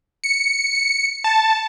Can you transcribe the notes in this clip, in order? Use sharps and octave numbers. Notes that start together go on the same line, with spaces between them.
C#7
A5